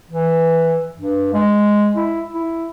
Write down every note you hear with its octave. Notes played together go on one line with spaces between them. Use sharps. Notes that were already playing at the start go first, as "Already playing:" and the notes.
E3
G2
G#3
E4
E4